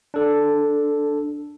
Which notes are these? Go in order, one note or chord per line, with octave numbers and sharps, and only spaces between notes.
D4 A4